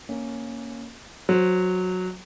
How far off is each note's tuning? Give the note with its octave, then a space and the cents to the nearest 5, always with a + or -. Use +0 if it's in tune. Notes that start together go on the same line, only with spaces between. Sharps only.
A#3 +0 C#4 +0
F#3 -10 C5 +0